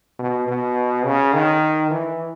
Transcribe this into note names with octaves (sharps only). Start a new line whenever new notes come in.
B2
B2
C#3
D#3
E3